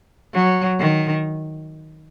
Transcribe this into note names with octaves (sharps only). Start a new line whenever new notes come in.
F#3
D#3